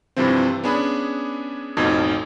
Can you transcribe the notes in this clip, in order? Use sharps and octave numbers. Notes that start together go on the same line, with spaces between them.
G2 C3 E3 F3 C4
B3 C#4 D4 G#4 B5
A1 F2 B2 D#4 A5 G#6